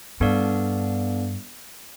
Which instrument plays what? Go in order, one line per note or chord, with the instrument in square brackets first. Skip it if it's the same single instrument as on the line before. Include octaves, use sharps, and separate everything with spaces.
[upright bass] G2 [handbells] B3 D4 A4 D5 F5